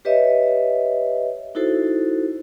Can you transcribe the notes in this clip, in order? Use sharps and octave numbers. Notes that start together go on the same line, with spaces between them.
G4 B4 C#5 D#5 E5
D#4 E4 F#4 A4 C5